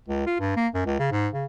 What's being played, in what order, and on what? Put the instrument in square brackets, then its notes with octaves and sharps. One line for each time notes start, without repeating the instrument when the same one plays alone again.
[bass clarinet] C#2
F4
G2
A#3
F#2
C#2
C#3
G#2
C#3